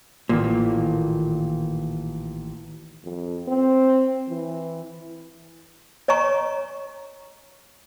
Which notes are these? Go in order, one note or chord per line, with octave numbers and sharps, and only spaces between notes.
A1 A#2 D#3
F2
C4
E3
C#5 D#5 G#5 A#5 C#6